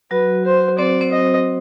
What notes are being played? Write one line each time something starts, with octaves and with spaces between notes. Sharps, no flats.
F#3 F#4 B4
C5
C4 C5 D5
C4 C5
D#5